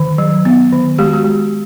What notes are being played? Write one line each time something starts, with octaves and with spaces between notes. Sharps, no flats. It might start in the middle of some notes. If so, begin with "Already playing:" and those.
Already playing: D#3
F#3
B3
D#3
G#3 G4
F#4
G4
G#3